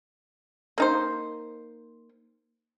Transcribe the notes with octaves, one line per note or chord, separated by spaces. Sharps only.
A#3 D#4 C5